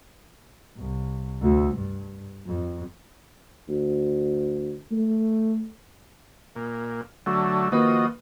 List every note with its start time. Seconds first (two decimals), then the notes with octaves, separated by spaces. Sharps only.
0.77 C2
1.42 D2
1.75 G2
2.47 F2
3.68 D2
4.92 A3
6.56 A#2
7.26 D3 F#3 A3
7.72 D#3 F3 A#3 F#4 B4 D#5